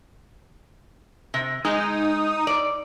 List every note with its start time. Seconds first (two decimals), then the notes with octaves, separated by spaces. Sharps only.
1.34 C3
1.65 G#3 D#4
2.47 D5